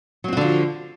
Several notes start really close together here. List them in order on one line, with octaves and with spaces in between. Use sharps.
F#3 C4 F#4 D3 F3